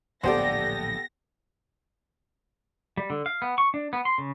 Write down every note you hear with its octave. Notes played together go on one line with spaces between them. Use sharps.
D1 A#1 B3 G4 A4 C5 D5 A#6
G3
D3
F5
B3
C#6
D4
B3
C6
C#3